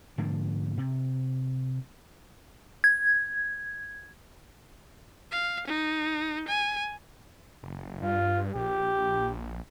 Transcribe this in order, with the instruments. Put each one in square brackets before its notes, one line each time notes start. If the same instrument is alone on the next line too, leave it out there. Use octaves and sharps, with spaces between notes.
[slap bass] G#2 D3 F3 A#3
C3
[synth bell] G#6
[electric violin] F5
D#4
G#5
[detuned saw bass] F#1
[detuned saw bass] G2 [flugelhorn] F4
[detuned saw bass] A#1 [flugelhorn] G4